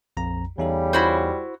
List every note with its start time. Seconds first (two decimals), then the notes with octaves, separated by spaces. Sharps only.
0.17 A#1 F2 A#5
0.58 E2 C#3 G3 D#4 A4
0.93 E4 F#4 C5